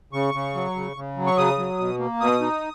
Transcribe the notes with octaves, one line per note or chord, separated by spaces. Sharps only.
C#3 C#6
C#3
F#3
C#3
C#3
F#3
C#6
C#3 D#6
F#3
B2
A#3
B2 D#6
D#4